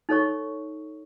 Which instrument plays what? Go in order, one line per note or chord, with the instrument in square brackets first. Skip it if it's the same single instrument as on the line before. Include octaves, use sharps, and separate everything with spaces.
[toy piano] D#4 A4 C#5 C#6